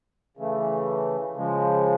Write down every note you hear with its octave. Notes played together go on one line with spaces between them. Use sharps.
C#3 E3 A3
C#3 F3 G#3